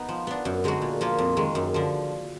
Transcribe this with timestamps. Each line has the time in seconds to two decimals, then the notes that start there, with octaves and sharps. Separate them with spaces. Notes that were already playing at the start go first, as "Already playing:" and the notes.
Already playing: B3 D#4
0.09 F3
0.27 B3 D4
0.45 F#2
0.64 D3 G#3 D#4 F#4
0.82 A#2
1.01 F3 A#3 F4
1.18 F2
1.37 D#3 G#3
1.55 F#2
1.74 D3 F3